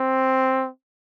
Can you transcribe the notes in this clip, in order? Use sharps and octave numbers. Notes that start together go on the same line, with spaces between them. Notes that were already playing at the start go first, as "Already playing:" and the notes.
Already playing: C4